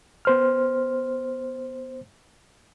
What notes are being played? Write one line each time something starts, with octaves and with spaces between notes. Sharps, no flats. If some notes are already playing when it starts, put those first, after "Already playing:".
B3 C5 F6